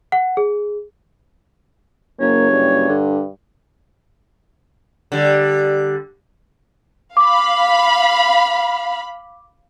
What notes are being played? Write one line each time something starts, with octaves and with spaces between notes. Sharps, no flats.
F#5
G#4
F#1 A#3 C#5
G2
D3
D3 G3
F5 B5 D6